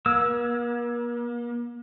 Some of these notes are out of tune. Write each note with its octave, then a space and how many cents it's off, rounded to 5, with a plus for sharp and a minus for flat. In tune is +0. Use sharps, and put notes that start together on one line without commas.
A#3 +45 E6 +0